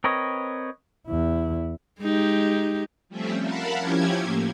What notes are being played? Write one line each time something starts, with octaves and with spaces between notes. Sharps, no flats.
C4 A#4 B4 C#5 D#5
E2 E4
G#3 D#4 G4
F3 G3 A3 C4 C#4 E5
A#4 F5 F#5 A5 B5
F3 C#4 E4 G4 G#6
A2 A#3